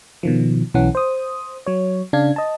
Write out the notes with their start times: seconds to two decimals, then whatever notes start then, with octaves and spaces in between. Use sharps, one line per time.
0.23 B2 D#3 F3
0.74 B1 E3 C#4 F#5
0.95 C5 D#6
1.66 F#3 C#5
2.13 C#3 D4 F5 G#6
2.36 D#5 A5